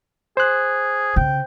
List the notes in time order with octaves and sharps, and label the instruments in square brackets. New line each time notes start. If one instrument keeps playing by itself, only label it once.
[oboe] G#4 [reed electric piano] C5 F#6
[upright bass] C#3 [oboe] G5